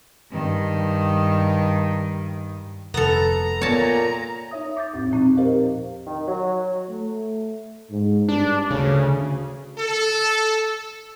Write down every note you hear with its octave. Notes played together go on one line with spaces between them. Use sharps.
G2 D#3
F1 B3 A4 A#5
A#2 B3 C#5 A5
D#4 C#5 E5 D#6
D6 G6 A6
E2 A2 C4
A#2 F3 C4 D#4
G4 A#4 C5 D#5 F5
D#3
F#3
A3
G#2
G2 D4
D2 C#3
A4